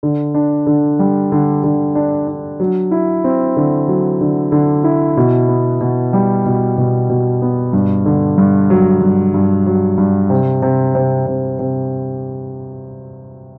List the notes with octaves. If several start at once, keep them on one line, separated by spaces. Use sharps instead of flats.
D3
D4
D3
G3
D3
D3
D4
D4
F#3
E4
C4
D3
F#3
D3
D3
E4
B2
B3
B2
G3
B2
B2
B2
B3
G2
D3
G2
F#3
G2
G2
F#3
G2
C3
C3
C3
C3
C3